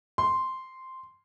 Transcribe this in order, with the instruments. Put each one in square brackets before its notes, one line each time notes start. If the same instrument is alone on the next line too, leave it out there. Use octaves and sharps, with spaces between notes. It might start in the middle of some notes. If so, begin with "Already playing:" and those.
[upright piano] C6